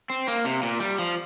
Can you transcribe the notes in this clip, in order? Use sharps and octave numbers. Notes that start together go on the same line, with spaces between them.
C4
A#3
C3
A#2
G3
F3